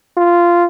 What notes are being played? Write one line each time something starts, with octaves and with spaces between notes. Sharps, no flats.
F4